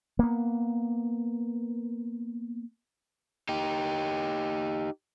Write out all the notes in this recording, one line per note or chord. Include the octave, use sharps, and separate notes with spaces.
A#3 B3
D#4 G4